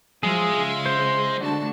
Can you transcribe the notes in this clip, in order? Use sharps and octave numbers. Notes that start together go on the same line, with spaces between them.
F3 F#3 G#3 F4 G#4 E5
C#3
C5
D3 A3 D4 F#4 A5